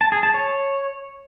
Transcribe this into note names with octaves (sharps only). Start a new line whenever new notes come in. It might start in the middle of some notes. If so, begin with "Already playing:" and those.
A5
G#4
A5
C#5